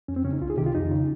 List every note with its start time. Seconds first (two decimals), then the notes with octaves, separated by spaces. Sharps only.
0.08 F2 C#4
0.16 C4
0.24 C#3 C#4
0.33 D#4
0.41 C2 F4
0.50 G#4
0.57 C3 D#3 G4
0.66 F4
0.75 F2 D#4
0.92 C#3